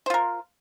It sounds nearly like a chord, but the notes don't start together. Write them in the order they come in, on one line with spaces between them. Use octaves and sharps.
C5 F4 A#4